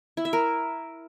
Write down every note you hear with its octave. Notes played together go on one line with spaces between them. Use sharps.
E4
E5
A#4